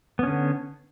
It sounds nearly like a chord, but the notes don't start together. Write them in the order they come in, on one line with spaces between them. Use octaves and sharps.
B3 C#4 D3